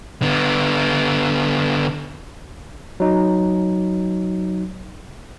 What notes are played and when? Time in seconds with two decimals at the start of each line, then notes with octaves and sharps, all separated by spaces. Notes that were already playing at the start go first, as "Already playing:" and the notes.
0.22 D3 B3
3.00 F#3 D#4